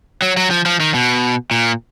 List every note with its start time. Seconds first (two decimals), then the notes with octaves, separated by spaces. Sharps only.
0.22 F#3
0.37 F#3
0.50 F3
0.66 F3
0.80 D#3
0.94 B2
1.51 A#2